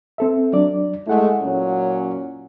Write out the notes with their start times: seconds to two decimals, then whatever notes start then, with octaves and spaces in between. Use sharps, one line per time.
0.18 C4 A4 E5
0.53 F#3 D4 D5
1.07 G#3 A3 E4 F#5
1.41 A#2 F#3 C#4